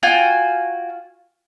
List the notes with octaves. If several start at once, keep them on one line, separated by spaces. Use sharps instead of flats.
F4 F#4 G5 G#5